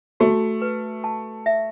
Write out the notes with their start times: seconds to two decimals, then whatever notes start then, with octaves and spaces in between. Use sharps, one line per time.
0.20 A3 F#4
0.62 B4
1.04 A5
1.46 E5